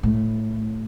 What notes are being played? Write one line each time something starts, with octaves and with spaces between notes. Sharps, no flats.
A2